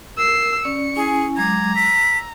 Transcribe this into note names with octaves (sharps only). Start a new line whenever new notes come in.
A#4 E6 C7
C#4 D5 C#7
C#4 E4 G#4 G#5
F#3 G#3 A#5 D6 G#6
E6 B6